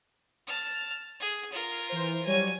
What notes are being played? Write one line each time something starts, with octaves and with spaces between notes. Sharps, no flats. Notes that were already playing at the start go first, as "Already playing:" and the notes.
A5 F6
G#4
F4 A#4
E3 C5
F#3 G3 C#5 G#5